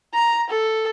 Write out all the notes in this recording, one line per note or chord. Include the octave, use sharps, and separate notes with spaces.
A#5
A4